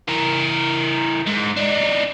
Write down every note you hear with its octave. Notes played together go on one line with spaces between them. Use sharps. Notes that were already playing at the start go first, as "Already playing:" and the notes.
E3 A#4
G#2
D4 D#4